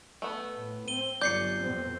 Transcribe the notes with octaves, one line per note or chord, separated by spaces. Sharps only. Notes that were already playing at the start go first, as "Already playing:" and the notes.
A3 B3
A2
C4 D#7 G7
G1 F#3 D5 G6 C7 C#7
F2 B2 C4